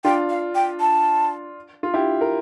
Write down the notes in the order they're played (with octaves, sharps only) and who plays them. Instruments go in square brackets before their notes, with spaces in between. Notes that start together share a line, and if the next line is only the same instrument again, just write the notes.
[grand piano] D4 F4 [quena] G5
[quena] F5
G5
A5
[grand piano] F4
E4 G4
A#4